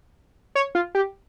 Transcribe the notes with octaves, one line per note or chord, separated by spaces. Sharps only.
C#5
F4
G4